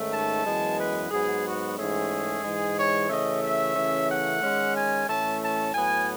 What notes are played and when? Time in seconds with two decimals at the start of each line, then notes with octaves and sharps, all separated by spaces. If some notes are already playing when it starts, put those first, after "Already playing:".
Already playing: G#2 D#3 A3 C#4
0.11 A5
0.45 F#2 E3 G#3 B3
0.78 B4
1.11 G#2 F#3 B3 G#4
1.44 F#4
1.77 G#2 E3 A3 C#4 G#4
2.43 G#2 E3 G#3
2.77 C#5
3.09 C#3 E3 A3 C#4 D#5
3.43 E5
3.76 C#3 E3 A3 C#4
4.09 F#5
4.42 D#3 G#3 C#4
4.75 G#5
5.08 A2 E3 A3 C#4 A5
5.41 A5
5.74 A2 F#3 B3 G#5